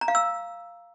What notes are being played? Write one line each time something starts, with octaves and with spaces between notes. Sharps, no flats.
A#5
F5
E6